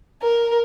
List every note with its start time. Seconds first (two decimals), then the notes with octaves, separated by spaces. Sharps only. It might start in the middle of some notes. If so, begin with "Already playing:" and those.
0.23 A#4